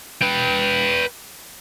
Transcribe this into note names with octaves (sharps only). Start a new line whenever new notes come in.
B4 G5